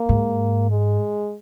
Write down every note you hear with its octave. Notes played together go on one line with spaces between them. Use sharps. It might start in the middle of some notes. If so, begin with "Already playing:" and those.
Already playing: A#3
G#2
G#3